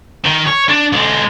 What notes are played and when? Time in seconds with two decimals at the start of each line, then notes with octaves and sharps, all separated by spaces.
0.24 D#3
0.47 C#5
0.69 D4
0.92 B1 G#3